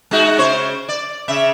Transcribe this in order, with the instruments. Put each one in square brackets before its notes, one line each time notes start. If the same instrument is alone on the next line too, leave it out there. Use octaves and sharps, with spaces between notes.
[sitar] G#3 D#4 F#4
C#3 C5 C#5
D5
C#3 E5